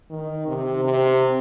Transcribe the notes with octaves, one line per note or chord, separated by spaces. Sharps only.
D#3
C3
C3